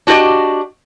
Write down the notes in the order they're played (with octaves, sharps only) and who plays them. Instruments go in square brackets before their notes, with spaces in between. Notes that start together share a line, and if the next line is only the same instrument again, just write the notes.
[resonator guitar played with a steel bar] D4 F#4 G4 A#4 D#5